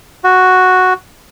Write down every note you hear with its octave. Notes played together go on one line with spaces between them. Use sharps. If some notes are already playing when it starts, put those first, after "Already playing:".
F#4